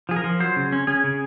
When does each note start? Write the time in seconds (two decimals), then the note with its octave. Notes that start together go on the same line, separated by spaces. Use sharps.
0.09 F3 G#4
0.16 A#4
0.24 F3
0.40 F#3 C5
0.56 C#3
0.72 C#4
0.87 C#4 G#4
1.04 C#3